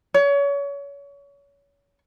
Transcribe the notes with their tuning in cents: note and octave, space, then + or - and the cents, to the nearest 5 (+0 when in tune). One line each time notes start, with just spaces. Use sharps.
C#5 +30